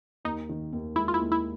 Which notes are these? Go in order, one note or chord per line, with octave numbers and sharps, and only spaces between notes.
D#2 D#4
D#3
D#2
G#3 E4
F4
E4
D#2
E4